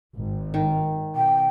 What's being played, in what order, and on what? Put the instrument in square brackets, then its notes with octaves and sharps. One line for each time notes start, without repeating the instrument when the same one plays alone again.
[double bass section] G#1
[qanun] D#3
[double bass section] B2 [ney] G5